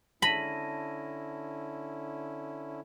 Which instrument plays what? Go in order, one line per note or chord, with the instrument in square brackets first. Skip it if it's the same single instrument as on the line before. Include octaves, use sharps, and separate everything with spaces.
[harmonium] D3 C#4 E4 [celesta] A5 A#6 D#7 [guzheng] B5